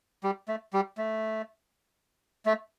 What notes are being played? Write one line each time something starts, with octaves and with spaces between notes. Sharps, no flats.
G3
A3
G3
A3
A3